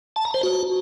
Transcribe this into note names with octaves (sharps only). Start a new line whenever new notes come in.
A5
A#5
C5
F#4